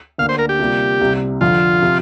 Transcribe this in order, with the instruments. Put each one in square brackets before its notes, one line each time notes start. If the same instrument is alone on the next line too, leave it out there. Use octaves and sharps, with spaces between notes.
[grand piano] D2 D3 A#3 D4 [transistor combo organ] F5
[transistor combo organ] C5
A#4
G4
[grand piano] C3 G3 A#3 F4
C2 C3 G3
[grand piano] F2 D3 F3 [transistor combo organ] F4
[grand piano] C3 F3